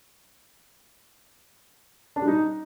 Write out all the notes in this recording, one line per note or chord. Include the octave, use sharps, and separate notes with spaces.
D4
G3
D#4